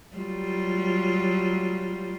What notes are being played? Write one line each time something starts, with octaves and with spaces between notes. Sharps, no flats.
F#3 G3 F4